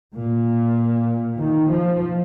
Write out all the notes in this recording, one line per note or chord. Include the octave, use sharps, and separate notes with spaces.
A#2
D#3
F3